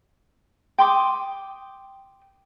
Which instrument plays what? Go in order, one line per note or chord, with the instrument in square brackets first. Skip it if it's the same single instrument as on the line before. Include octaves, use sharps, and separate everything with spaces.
[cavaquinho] G5 C6 D6 D#6